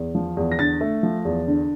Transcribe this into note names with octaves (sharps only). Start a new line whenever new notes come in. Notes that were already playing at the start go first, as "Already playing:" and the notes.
Already playing: E2
F3
E2
A#6
D3 A6
A3
F3
E2
D3